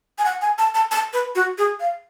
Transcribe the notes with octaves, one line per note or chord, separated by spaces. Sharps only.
G#5
F#5
G#5
A5
A5
A5
B4
F#4
G#4
F5